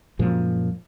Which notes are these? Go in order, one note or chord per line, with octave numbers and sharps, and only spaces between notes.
F#2 A#2 F3 G#3